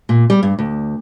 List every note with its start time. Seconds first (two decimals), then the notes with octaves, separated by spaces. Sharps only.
0.09 A#2
0.30 G3
0.43 G2
0.59 D2